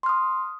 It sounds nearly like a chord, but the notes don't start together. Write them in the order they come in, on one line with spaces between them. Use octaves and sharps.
C6 F6 D#6